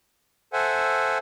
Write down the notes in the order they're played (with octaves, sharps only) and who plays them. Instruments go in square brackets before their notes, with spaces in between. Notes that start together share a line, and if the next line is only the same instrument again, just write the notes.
[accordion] A4 C5 E5 F#5 G#5